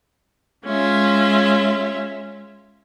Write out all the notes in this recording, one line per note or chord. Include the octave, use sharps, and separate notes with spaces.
G#3 C#4 F4 E5